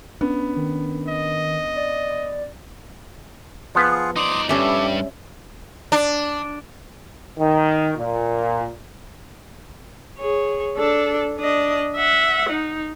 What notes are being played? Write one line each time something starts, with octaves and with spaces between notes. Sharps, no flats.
B3 C#4 D4
D#3
D#5
D5
F3 B3 F4 G#4 B4 F#5
D#4 D5 C6 D6 D#6
G2 G3 C#4 G4 A4 E5
D4
D#3
A#2
G#4 C#5
D4 A4
D4 D#5
E5 F#5
D#4